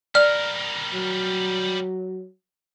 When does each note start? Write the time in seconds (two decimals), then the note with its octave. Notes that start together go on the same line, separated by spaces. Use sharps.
0.15 G3 A#4 D5 F6
0.94 F#3